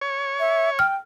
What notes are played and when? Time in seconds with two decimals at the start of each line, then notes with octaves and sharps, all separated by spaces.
0.01 C#5
0.40 E5
0.79 G5 F6